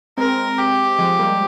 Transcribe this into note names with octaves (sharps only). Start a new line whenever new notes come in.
G#3 C4 A#4
G4
F3 G#3
G3 A#3